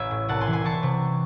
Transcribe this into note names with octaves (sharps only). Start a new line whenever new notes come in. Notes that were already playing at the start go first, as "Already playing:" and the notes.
Already playing: A1 E5 G#5
A2
C2 F#5 A5
G#5 C6
E3
G#5 C6
E3 A5 C#6
C3